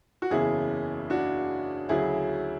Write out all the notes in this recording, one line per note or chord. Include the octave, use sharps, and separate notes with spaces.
F#4
F#1 E2 C#3 E3 E4 G#4
D4 F#4
D2 C#3 F#3 E4 G#4